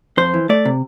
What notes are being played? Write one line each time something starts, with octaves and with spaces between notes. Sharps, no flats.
F2 C5
E3
A3 D5
C3